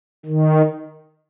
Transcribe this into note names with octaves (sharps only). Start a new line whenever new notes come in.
D#3